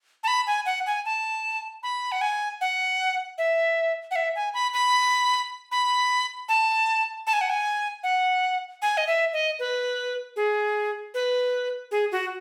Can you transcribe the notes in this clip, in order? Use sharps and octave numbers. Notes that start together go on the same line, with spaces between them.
A5
B5
G#5
F#5
G#5
A5
B5
F#5
G#5
F#5
E5
F#5
E5
G#5
B5
B5
B5
A5
A5
G#5
F#5
G#5
F#5
G#5
D#5
E5
D#5
B4
G#4
B4
G#4
F#4